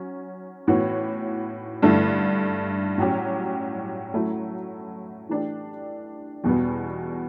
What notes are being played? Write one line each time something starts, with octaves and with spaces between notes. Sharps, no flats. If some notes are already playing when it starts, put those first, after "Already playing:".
Already playing: F#3 C#4
A2 E3 B3 F#4 C#5
G2 D3 A3 E4
A2 F#3 C#4 G4
F#3 A3 E4
E3 A3 D4 G4
E2 B2 G3 B3